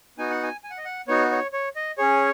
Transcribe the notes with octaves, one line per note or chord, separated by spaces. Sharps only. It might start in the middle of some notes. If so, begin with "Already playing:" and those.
B3 D#4 F#4 G#5
F#5
G#5
G#5
F#5
D#5
F#5
B3 D#4 F#4 C#5
C#5
C#5
D#5
C#4 G#4 C#5